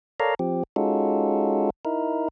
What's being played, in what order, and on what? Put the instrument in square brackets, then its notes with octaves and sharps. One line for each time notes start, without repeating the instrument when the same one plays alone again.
[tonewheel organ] A4 A#4 C#5 D5 F5 A#5
F3 C4 G4
G#3 C#4 D#4 F4 F#4 A4
D#4 E4 A#4